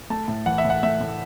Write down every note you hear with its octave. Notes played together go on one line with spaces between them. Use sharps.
A3 A5
A2
E3 F#5
E5
A2
F#5
A3 E5
A2